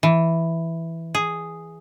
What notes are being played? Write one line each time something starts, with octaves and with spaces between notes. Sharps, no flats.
E3
G#4